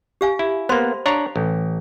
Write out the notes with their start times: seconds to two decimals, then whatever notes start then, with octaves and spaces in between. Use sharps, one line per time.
0.21 G4 F5 G#5
0.39 E4
0.69 A#3 B3 C5 B5 C6
1.06 D4 C#5 F5 A#5
1.36 A1